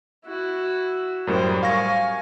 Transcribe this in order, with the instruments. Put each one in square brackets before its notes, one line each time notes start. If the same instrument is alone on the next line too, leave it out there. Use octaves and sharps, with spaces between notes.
[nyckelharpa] E4 F#4
[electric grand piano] F#2 A2 G3 [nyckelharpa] A#4 C5
[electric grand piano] F5 C#6 A#6 [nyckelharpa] G#5